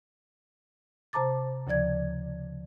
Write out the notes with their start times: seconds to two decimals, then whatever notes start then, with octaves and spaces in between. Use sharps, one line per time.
1.13 C3 C5 A5 A#5 D6 A6
1.67 D2 C#3 F3 D5 G#6